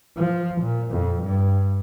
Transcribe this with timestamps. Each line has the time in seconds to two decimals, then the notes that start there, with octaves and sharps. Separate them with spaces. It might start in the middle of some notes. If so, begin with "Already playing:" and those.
0.17 F3
0.61 A#2
0.91 F2
1.23 G2